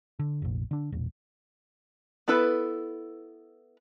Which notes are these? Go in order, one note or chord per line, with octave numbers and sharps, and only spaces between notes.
D3
F1 A#1
D3 D4
E1 A#1
B3 E4 A4 B4